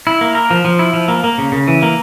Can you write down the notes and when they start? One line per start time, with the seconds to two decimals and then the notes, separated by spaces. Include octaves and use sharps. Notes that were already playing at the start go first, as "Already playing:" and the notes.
0.07 E4
0.21 A#3
0.35 A#4
0.51 F3
0.65 F3
0.79 E4
0.94 F3
1.08 A#3
1.24 A#3
1.38 C#3
1.52 C#3
1.68 E3
1.83 A#3